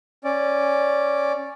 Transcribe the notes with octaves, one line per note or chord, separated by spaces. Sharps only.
C#4 D5